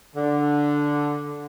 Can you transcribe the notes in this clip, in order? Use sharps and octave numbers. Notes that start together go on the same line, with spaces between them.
D3